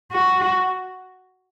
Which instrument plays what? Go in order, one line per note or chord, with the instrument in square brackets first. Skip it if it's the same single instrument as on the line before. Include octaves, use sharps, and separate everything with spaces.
[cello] F#4